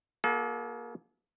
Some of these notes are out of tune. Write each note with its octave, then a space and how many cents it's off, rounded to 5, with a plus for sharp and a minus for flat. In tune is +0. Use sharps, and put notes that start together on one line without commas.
A#3 +20 F#4 +0 A4 -45